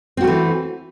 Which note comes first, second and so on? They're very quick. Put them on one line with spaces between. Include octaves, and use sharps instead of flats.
C4 F#4 A3 E3